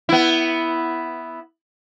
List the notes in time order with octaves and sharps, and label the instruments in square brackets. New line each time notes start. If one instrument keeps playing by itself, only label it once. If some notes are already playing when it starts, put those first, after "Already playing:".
[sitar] B3 E4